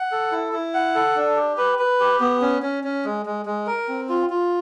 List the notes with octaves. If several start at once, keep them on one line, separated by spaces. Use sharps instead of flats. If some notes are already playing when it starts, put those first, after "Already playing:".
Already playing: F#5
A4
E4
E4
F#5
A4
D4
G4
B4
B4
G4
B3
C#4
C#4
C#4
G#3
G#3
G#3
A#4
C4
F4
F4